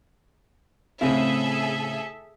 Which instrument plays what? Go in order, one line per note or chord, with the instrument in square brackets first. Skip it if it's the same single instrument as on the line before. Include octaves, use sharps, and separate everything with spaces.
[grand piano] A2 C#3 F5 [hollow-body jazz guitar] C4 E4 [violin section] G#4 A4 E5